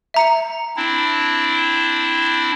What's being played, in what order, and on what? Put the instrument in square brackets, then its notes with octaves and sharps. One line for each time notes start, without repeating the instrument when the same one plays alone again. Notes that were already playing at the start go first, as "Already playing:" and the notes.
[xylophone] E5 A#5 C#7
[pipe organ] C4 D4 E4